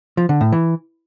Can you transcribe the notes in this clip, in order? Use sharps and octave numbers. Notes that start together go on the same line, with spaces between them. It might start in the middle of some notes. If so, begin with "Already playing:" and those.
F3
D3
A2
E3